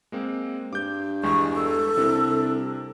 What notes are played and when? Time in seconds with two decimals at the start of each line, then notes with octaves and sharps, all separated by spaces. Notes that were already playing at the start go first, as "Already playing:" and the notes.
0.12 G#3 A#3 C4
0.73 G2 D6 G6
1.23 E2 G3 G#3 C#6
1.55 A4
1.97 C2 C3 D4 A#4